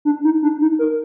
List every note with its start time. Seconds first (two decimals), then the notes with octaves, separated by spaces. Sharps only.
0.05 D4
0.24 D#4
0.42 D4
0.61 D#4
0.79 A#4